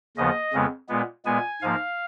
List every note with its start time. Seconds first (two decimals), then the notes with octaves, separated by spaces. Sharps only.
0.17 D#2 C#3 F3 B3 D#5
0.53 F2 C#3 G#3 B3
0.89 A#2 G#3 B3
1.25 A#2 G#3 B3 G#5
1.62 G#2 F3 A#3 F5